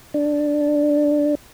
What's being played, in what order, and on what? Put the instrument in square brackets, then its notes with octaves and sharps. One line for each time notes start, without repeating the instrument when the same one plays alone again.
[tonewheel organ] D4